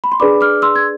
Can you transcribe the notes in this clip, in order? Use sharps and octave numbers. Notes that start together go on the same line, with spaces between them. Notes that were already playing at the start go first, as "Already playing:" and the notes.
B5
C6
D4 G#4 B4 D5 B5 D6
D6 F6
C6 E6
G#6